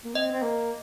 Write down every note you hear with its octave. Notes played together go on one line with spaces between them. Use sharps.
A#3
C4 D#5
C4
A#3